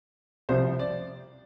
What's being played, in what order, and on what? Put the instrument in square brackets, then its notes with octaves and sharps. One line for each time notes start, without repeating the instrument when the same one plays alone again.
[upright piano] C2 C3 F3 C5
D5